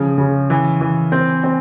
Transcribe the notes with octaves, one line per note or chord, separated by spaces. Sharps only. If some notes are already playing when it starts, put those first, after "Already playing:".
Already playing: C#3 F3
C#3
E3
E3
C4
C4